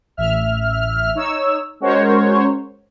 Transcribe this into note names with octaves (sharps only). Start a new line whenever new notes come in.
A1 E5 F6
D#4 C#5 E6
G#3 C#4 F#4 A#4 C5 C#5